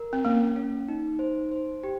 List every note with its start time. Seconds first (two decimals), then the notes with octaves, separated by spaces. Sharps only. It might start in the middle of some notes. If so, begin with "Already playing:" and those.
Already playing: A#4
0.13 C4
0.25 A#3 C#4
0.56 C#4
0.88 D#4
1.19 C5
1.51 C5
1.84 G4